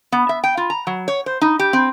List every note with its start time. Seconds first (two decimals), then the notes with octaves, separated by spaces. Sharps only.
0.12 B3
0.29 E5
0.44 G5
0.57 F4
0.70 A#5
0.87 F#3
1.08 C#5
1.26 C5
1.41 D#4
1.59 G4
1.73 C4